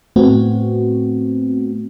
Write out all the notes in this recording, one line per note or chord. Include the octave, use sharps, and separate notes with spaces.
A2 A3 B3 C4 F#4